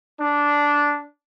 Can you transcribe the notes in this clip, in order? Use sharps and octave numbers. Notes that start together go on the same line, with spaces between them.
D4